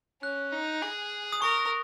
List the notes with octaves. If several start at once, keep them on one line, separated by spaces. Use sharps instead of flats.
C#4 F#6
D#4
G#4
D#6
A#4 C#6